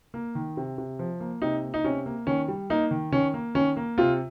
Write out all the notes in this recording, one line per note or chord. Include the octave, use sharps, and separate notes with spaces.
A#3
D#3
C3
C3
F3
A#3
C3 D#4
A#3
D#4
C3 C#4
A#3
D#3 C#4
G3
A#3 D#4
D#3
D#3 C#4
A#3
D#3 C#4
A#3
C3 F4